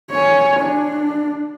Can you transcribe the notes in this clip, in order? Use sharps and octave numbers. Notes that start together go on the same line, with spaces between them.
C#5 G#5
D4